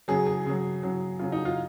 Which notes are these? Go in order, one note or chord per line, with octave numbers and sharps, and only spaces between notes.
C#3 F#3 G#4
G#4
C#3 F#3
C#3 F#3
C#3 F#3 F4
D#4
F4